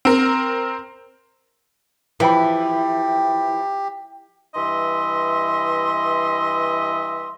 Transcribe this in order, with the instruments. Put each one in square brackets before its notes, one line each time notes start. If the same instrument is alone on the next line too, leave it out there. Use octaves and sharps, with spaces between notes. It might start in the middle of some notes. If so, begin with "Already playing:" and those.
[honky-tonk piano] C4 A#4
[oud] E3 [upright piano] F3 G5 B5 [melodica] G4
[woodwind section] G2 E3 D#5 E5 C6